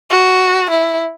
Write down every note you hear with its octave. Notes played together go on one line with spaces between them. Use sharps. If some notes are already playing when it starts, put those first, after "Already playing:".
F#4
E4